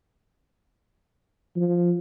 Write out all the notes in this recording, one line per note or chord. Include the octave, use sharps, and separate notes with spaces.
F3